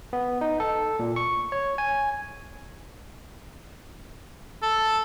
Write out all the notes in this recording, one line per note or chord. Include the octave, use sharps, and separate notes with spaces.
B3
D#4
A4
A#2
C#6
C#5
G#5
A4